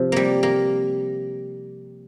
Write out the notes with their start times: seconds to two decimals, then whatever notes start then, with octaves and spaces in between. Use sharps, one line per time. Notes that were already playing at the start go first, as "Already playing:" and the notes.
Already playing: C3 F3
0.12 G3 A#3
0.43 A#3